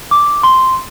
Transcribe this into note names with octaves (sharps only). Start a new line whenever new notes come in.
D6
C6